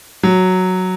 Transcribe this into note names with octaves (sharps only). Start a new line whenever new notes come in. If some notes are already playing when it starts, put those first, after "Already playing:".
F#3